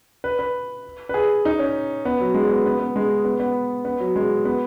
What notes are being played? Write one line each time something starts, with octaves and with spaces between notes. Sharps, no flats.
B4
B4
B4
G#4
D#4
C#4
B3
F#3
G#3
B3
B3
B3
G#3
B3
B3
B3
F#3
G#3
B3